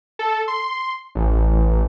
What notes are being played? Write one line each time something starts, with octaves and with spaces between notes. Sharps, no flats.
A4
C6
A1